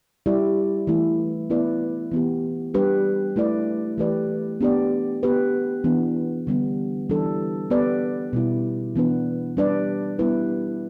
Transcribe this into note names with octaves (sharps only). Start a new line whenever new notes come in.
G3 E4 G4 D5
E3 A3 E4
B3 E4 B4 D5
E3 B3 G4
G3 D4 G4 B4
A3 E4 B4 D5
E3 A3 G4 B4 D5
B3 D4 G4 D5
B3 G4 B4
E3 B3 D4
D3 G3 B3
E3 G3 D4 A4
B3 G4 B4 D5
B2 G3 E4
E3 B3 D4 B4
G3 D4 B4 D5
G3 B3 E4 B4